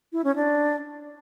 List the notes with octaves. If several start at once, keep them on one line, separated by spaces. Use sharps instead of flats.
E4
C#4
D4